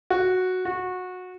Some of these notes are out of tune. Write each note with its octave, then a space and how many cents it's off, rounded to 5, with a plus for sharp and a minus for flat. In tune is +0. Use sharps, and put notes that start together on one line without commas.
F#4 -5
F#4 -20